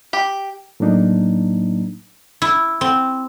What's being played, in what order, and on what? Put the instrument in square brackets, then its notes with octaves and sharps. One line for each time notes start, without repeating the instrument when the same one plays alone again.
[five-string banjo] G4
[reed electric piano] A2 F#3 A#3 D4 D#4
[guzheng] E4
C4